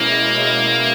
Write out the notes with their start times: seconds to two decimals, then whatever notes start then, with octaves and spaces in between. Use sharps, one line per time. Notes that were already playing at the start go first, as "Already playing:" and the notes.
Already playing: B2 G#3 A#3 C#4 E4
0.35 B2 G#3 C#4 E4